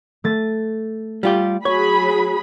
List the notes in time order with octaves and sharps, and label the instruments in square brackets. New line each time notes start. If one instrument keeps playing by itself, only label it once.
[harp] A3 A6
[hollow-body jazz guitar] G3 F4 G4
[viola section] F#3 G#4 B5 [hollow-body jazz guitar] C#5